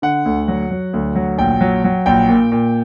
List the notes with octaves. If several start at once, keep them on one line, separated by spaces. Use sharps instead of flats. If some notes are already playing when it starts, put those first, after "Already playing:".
D3 F#5
D2
F#3
F#3
D2
F#3
A#1 G5
F#3
F#3
A#1 G5
A#2
A#2